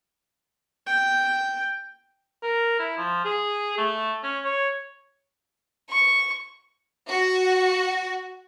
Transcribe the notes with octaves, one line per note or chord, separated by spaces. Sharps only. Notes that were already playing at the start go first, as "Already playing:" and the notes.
G5
A#4
E4
F3
G#4
A3
C#4
C#5
C#6
F#4